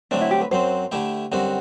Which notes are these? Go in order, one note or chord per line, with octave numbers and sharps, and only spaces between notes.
D3 F#3 A3 C4 D4
E4
G4
B4
F#2 F#3 C4 C5
D3 A3 E4 G4
F#2 D3 G3 C4 F#4